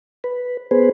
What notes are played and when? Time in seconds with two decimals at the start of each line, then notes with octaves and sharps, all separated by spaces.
0.24 B4
0.71 B3 G#4 B4 C5